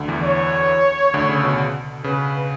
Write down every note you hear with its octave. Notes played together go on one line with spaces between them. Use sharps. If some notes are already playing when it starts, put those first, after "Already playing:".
Already playing: D2 D3
E2 E3
C#5
D2 D3
C#3
B2
C#3 B4